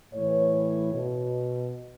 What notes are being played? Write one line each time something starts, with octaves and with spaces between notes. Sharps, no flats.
A2 E3 C#5
B2